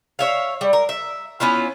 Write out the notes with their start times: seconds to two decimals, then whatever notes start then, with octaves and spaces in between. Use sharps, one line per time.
0.19 C#5 E5 F5
0.61 G3
0.73 A#4
0.89 E5
1.40 B3 C#4 E4 F4